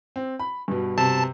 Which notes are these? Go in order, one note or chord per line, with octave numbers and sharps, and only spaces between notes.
C4
B5
G2 B2
C3 A5